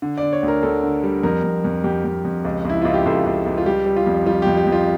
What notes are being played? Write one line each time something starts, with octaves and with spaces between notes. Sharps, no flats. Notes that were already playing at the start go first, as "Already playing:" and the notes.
D3
D5
D3
C#5
D2
A#4
D2 A4
D3
G3
F2 A#4
F2
F2
F2 G4
F2
F2
C#2
C#2 E4
C#2 F4
G4
C#2 A4
C#2
C#2
F4
G3 G4
G3
F4
F2
G3 F4
F2 G4
G4
F2
F4